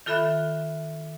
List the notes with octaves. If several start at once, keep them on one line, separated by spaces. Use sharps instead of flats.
D#3 F4 A4 E5 B5 F#6